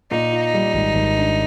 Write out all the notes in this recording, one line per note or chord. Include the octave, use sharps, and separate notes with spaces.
A#2 D#4
F4
G3
G#1
G#1
D4